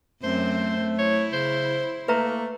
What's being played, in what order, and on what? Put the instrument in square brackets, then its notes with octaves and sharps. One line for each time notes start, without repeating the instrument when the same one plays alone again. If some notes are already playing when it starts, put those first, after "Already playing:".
[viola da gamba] F#2 C4 [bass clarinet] A3 [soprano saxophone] C5
[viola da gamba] E4 [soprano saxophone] C#5
[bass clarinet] C#3 [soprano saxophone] C5
[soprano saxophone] A3 [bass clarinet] A#3 [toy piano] B4 E5 A#5